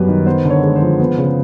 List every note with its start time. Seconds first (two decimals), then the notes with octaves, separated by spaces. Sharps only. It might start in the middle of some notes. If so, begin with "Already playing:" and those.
Already playing: F#2 G3 B3 B4
0.08 D#3
0.26 B3 C5
0.45 D3
0.50 C#5
0.63 G#3
0.76 C5
0.82 F3
1.00 B3
1.18 C#3